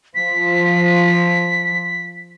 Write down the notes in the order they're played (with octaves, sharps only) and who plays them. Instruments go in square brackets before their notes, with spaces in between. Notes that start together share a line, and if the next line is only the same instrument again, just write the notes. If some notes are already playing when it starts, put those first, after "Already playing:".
[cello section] F3 [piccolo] B6